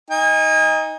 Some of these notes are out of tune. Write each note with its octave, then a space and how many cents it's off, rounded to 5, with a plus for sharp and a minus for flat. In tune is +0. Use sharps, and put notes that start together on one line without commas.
D#4 +10 G#5 -35